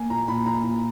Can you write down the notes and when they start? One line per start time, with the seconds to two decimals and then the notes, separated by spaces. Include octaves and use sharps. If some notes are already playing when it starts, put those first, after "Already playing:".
Already playing: A#3 G#5
0.10 A#2 A#5
0.28 A#2 B5
0.46 A#2 A#5
0.64 A#2